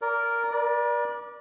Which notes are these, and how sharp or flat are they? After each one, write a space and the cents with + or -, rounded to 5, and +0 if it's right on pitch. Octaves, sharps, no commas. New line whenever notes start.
A#4 +0 D5 -30
A#4 +45 D5 +0